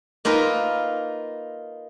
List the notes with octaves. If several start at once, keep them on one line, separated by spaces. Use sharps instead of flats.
A#3 D#4 F4 A#4 B4